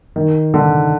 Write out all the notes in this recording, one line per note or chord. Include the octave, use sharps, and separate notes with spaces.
D#3
D3